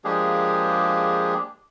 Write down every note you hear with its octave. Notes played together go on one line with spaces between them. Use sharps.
F3 G#3 A#3 D4 G4 G#4